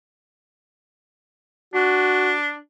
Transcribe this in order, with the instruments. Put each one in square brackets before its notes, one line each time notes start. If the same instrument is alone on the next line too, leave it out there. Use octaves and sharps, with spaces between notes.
[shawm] D4 [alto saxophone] F#4